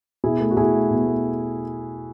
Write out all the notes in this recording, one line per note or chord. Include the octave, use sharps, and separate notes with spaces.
B2 E4 G#4
A3
F#4
B2 E4 G#4
A3
B2
A3